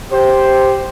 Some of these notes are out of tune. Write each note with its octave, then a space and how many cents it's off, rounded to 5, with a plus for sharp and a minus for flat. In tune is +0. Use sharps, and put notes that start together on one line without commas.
G4 +0 C5 +0